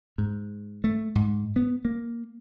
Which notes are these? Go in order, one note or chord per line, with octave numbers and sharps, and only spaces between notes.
G#2
A3
G#2
B3
A#3